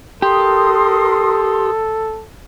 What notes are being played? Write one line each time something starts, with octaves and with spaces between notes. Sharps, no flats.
G4 A4 A#4 C6 D#6